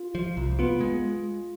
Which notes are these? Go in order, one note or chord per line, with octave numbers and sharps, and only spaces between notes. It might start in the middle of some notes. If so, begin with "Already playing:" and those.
Already playing: F4
F3
C2
B3 F4
G#3